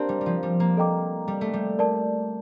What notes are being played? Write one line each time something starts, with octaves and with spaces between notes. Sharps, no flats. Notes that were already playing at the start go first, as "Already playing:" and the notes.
Already playing: A#3 C4 D4 G4 A#4 D5 A5
G3
G3
F3
G3
A#3
A4 D#5 G5 A#5 D6
G3
A3
G3
A#4 D5 A5